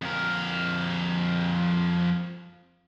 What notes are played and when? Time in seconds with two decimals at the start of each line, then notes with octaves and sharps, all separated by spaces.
0.02 F2 A#4